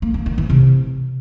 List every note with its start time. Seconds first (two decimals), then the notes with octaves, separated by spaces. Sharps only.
0.02 A#3
0.14 A#3
0.26 D#3
0.38 E3
0.50 C3